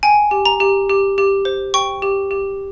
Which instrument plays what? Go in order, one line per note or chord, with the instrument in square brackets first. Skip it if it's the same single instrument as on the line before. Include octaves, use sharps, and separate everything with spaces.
[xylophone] G5 G#5
G4
A#5
G4
G4
G4
C5
G5 C#6
G4
G4